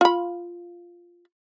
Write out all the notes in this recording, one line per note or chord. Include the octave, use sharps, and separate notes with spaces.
F4 B5